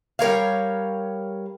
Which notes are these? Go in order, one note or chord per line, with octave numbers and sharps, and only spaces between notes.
G3 A#4 C#5 F5